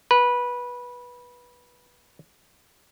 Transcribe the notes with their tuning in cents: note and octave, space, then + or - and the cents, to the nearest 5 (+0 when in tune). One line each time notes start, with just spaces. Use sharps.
B4 -15